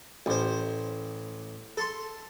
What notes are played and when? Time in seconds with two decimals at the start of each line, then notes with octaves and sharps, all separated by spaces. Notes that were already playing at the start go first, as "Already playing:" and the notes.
0.26 A1 C5
1.77 A4 C6